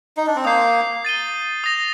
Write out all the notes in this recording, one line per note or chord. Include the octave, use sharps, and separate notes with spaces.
D#4
D4
C4
A#3 D#6 G6 C7
A6 D#7 G7
D#6 A#6 F7